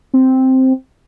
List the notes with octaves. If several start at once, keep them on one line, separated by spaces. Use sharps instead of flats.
C4